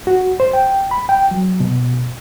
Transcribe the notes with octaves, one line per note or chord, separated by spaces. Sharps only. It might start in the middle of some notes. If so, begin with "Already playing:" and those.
F#4
C5
G5
B5
G5
F#3
B2